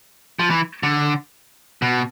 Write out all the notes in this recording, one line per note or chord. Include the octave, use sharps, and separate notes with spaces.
F3
E3
D3
B2